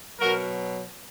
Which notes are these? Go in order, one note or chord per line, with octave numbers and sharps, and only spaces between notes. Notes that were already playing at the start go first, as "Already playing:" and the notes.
B2 F#3 F#4 A#4